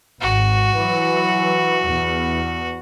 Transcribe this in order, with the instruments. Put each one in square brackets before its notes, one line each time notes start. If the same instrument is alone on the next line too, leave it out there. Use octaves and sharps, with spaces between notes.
[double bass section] G#1 [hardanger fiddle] F#4
[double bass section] E3 F#3
E2